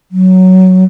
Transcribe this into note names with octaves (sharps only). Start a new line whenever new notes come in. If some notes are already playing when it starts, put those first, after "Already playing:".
F#3